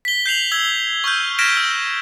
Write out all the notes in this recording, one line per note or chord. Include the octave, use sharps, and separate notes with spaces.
B6 G7
G6 C7 F7 F#7
E6 G#6 G7
C#6 E6 F6 G6
F6 G#6 A#6 B6 D7 E7
E6